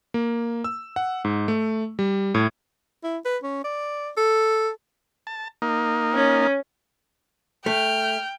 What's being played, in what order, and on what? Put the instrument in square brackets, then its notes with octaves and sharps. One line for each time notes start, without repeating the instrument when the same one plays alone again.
[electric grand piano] A#3
E6
F#5
G#2
A3
G3
A2
[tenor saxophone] E4
B4
C#4
D5
A4
[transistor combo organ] A5
A#3 D#4
[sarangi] C#4
[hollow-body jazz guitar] A3 [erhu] G5 [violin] F6